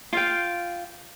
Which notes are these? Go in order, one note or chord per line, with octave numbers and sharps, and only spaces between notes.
F4 F5 G5